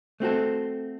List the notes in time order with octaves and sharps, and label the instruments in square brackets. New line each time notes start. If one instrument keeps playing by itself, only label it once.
[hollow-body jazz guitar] A3 C4 F#4 A4